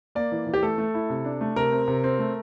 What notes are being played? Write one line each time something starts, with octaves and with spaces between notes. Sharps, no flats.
A#3 D5
E3
E3
G4
A3 A4
A3
E4
C3
D4
A3
C3 A#4
C4
C3
C4
A3